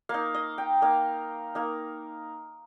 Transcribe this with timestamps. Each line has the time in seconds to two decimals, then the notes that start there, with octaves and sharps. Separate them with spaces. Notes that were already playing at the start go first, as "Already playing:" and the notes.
0.09 A#3 D#4 F5
0.34 D#5
0.58 G5
0.82 A#3 D#4 F5
1.55 A#3 D#4